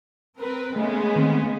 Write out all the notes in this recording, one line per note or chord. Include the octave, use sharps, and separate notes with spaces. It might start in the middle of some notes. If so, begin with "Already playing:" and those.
C4 A#4 B4
C#3 G#3 A3 B3
D#3 A3 C4